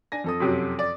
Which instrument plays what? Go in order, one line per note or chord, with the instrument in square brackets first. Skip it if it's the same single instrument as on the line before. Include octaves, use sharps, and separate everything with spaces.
[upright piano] D4 G#5 A#6
F2 A4 D#6
[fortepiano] F#2 C3 F#3
D5